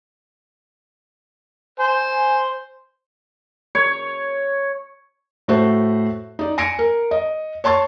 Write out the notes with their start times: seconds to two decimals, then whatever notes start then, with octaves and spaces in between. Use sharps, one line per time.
1.80 C5 G#5
3.75 C#5
5.48 A2 A3 F#4 A4 C5
6.39 D#4 D5
6.58 G#5 A#6 C#7 D7
6.79 A#4
7.11 D#5
7.64 C#5 A5 C6 C#6 A6